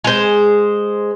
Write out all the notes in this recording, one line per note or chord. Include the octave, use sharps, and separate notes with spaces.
G#3 C5